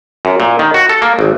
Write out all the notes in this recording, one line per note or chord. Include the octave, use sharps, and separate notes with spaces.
F#2
A#2
D#3
F#4
A4
A#3
G#1